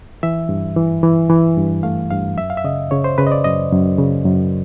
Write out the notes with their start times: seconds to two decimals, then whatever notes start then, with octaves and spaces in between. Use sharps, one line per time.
0.23 E3 E5
0.49 G2
0.76 E3
1.03 E3
1.30 E3
1.57 G2
1.83 A3 F5
2.10 G2 F5
2.37 F#2 E5
2.50 F5
2.57 E5
2.64 C#3 D#5
2.91 C#3 C#5
3.04 C5
3.18 C#3 B4
3.27 D#5
3.32 D5
3.44 F#2 D#5
3.72 F#2
3.98 C#3
4.26 F#2